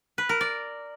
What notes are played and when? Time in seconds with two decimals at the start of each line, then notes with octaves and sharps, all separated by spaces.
0.18 B4
0.29 A#4
0.41 D5